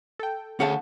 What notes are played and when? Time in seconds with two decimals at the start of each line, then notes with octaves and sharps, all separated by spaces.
0.19 A4 G5
0.60 D2 C#4 G#4 F5 F#5 A5